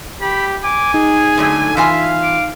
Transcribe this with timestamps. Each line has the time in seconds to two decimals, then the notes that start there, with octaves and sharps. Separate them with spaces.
0.21 G4 B5
0.64 G#5 D6
0.94 D#4 G#4
1.38 D3 F#3 A3
1.77 E3 F4 E5 F5 G#5
2.23 D6